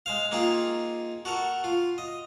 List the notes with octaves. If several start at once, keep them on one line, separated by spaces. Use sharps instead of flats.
G#3 C5 F5
A#3 C4 D#4 F4 G#4
F#4 A4 A#4
F4
D#5